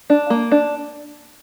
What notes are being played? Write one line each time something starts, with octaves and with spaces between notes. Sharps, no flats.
D4
A#3
D4